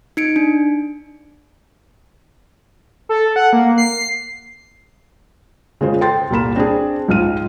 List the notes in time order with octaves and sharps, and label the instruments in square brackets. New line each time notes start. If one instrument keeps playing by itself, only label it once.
[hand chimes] D#4 C#7 D7
D4
[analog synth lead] A4
F#5
A#3
C7
[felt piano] C#3 G#3 F4 C5
A4 G5 C6 A6
C2 A#2 A#3 B5 E7
C4 D4 G#4
C#2 G#2 F4 F6 D#7